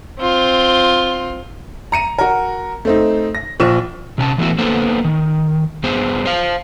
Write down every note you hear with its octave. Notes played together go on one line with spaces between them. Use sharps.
C4 F4
A#5 C#7 D#7
F#4 A#4
A3 C4 D#4
A#6
A#1 F3 C#6 E7
C3 C#4 G#5 A5
E3 A3 B3 E4 F#4
D3 A#3 B3 A4 C5
D#3
G2 B3 G#4 C5
C5 F5